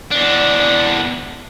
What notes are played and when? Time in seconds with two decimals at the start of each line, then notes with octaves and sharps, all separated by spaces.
0.12 E2 D4